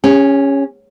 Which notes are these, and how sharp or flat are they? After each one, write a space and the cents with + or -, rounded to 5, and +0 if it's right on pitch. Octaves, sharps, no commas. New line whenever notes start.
C#4 +0 G#4 -40